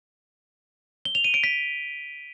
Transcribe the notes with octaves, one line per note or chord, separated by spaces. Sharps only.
G7
F7
D#7
D7
B6